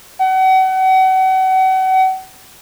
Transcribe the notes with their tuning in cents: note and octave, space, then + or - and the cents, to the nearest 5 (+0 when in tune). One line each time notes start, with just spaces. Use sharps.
F#5 +35